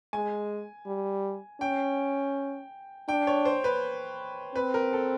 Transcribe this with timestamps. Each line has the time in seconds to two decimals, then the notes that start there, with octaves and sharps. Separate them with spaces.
0.13 G#3 G#5
0.87 G3
1.61 C#4 G5
3.08 D4 G5
3.27 C#5
3.45 C5
3.64 B4
4.55 C4 B4
4.74 A#4
4.93 A4